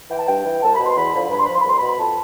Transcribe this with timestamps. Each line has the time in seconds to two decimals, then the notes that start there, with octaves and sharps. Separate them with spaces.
0.10 E3 G5
0.19 A5
0.27 G2 G5
0.45 E3
0.62 C2 A5
0.74 B5
0.79 B2
0.85 C6
0.97 E2 B5
1.13 D3 F3 B5
1.30 G2 B5
1.38 C6
1.45 B5
1.48 F3
1.53 C6
1.60 B5
1.65 C2 C6
1.76 B5
1.81 B2
1.90 B5
1.99 F2 A5